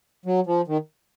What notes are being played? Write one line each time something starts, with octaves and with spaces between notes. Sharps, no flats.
F#3
F3
D#3